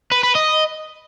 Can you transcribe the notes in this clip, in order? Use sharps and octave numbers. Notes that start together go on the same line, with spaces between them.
B4
B4
D#5